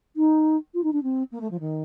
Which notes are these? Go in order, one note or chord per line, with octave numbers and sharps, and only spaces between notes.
D#4
F4
D#4
D4
C4
A#3
A3
F3
D#3